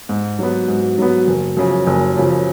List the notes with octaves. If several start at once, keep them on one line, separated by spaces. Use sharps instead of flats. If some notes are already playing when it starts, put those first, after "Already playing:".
G#2
F#3 B3
G#2
F#3 B3
F#1
F#2 C#3 F3
F#1
F#2 C#3 F3